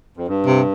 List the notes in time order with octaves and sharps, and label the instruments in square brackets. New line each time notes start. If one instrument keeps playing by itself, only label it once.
[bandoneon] F2
G2
[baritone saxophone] C3